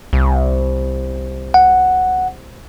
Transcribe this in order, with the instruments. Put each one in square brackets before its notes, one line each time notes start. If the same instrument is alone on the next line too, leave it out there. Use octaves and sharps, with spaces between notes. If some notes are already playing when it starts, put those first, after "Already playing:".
[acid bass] C2
[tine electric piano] F#5